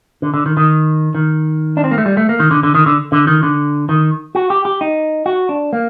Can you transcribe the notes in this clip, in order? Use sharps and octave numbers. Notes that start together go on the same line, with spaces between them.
D3
D3
D#3
D#3
D#3
D4
C4
A#3
A3
G3
A3
A#3
D#3
D3
D3
D#3
D3
D3
D#3
D3
D#3
F#4
G4
G4
D#4
F#4
D4
A#3